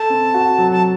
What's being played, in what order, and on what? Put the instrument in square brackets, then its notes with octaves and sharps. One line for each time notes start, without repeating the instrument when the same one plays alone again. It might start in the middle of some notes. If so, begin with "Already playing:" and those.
Already playing: [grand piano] A4 [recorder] A5
[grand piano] C4
F#4
F#3
[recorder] A5